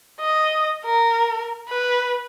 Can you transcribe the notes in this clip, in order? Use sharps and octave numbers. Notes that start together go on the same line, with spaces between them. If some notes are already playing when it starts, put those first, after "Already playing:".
D#5
A#4
B4